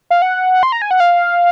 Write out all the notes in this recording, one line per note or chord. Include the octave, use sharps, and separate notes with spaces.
F5
F#5
C6
A#5
G#5
F#5
F5